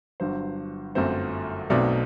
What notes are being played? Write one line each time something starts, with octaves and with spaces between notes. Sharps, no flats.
G1 G2 F#3 C5
G1 F#2 F#3 A3 C4 C5
B1 B2 F#3 A3 C4 D5